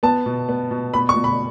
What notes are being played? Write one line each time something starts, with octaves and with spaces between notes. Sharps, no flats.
B3 A5
B2
B3
B2
B2 B5
C#6
B2
B5